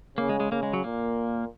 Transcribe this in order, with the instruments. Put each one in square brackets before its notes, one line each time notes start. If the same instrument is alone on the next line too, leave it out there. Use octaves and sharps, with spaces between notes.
[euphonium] C#3 [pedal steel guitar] A#3
[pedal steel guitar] G#3
G#3
[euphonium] C#3 [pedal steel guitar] A#3
[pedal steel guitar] G#3
F#3
[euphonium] A#2 [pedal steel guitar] A#3